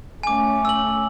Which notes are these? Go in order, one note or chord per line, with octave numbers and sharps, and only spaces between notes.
A3 C#4 G#5 D6
E6 F#7